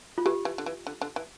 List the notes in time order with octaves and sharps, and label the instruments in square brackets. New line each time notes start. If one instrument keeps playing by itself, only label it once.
[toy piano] F4
[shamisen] E3 [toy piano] G4
[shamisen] E3
D3
E3
D3
D3
E3